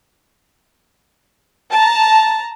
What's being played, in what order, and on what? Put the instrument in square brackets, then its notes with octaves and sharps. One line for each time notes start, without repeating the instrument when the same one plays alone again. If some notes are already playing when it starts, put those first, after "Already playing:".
[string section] A5 A#5